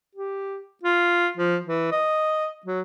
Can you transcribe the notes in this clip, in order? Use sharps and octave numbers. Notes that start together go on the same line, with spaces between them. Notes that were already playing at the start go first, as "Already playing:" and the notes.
G4
F4
F3
E3
D#5
F#3